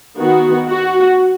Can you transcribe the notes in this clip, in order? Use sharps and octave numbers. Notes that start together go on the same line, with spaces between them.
D#3 B3 F#4
F#4